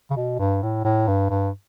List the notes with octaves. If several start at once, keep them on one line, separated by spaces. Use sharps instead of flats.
C#3
B2
G2
A2
A2
G2
G2